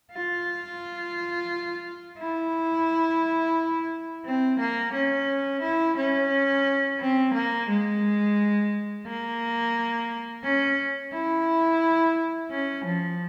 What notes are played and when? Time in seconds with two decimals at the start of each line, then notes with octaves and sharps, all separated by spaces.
0.12 F4
2.18 E4
4.25 C4
4.59 A#3
4.94 C#4
5.62 E4
5.97 C#4
7.00 C4
7.34 A#3
7.69 G#3
9.07 A#3
10.44 C#4
11.13 E4
12.51 C#4
12.85 F3